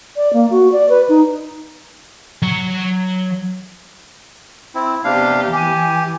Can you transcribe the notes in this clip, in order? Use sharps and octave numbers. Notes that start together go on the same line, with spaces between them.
D5
A#3
F#4
D5
B4
D#4
F#3 C#5
C4 E4
C3 B3 D4 G4 F5
E3 G4 G#5